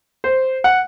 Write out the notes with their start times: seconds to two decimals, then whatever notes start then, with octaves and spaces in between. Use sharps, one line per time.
0.24 C5
0.64 F#5